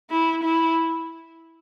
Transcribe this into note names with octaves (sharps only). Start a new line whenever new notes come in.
E4
E4